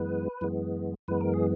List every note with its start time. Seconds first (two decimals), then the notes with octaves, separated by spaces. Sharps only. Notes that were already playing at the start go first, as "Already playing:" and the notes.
Already playing: F#2 E3 G#3 B3 B4
0.41 F#2 E3 G#3 B3
1.08 F#2 E3 G#3 B3 B4
1.21 A#4
1.34 G#4